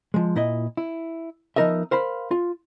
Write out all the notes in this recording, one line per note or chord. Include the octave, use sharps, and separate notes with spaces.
F3 G#3
A#2 E4 D#5
E4
F3 B3 D#4 A#4 D#5 E5
A#4 C5 F5 B5
F4